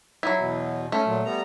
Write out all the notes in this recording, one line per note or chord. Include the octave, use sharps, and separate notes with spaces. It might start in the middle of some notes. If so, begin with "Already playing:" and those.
F#3 E4
E2 B2
A3 C#4
A#2 F#3
G3 B3 A#5